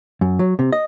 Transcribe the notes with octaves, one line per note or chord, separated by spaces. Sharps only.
F#2
F#3
C3
D#5